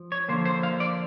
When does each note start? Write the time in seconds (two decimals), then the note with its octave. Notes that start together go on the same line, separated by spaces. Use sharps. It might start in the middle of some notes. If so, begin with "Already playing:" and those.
Already playing: F3
0.12 C#5
0.29 D3 F3 A#3 C5
0.45 C5
0.63 F5
0.80 D5